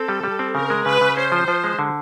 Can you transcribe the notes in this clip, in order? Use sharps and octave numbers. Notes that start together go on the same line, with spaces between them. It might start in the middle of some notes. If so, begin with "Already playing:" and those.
Already playing: C4 A4
G3
G3
C4
C#3 A#4
G#3
C#3 B4
C#3
C#4 C5
F3
F3
G#3
D3